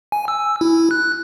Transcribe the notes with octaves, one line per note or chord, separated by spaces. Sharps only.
G#5
E6
E4
F#6